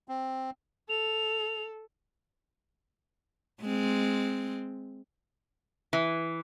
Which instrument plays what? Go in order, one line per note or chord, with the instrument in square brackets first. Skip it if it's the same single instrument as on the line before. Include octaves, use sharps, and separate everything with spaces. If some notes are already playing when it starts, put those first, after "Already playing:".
[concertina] C4
[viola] A4 [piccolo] F7
[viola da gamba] G#3 C4
[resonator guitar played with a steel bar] E3